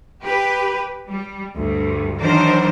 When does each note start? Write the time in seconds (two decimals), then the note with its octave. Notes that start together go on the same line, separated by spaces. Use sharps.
0.22 G4 B4
1.08 G3
1.54 D2 G2
2.20 D#3 E3 F#3 D4 A#4 C5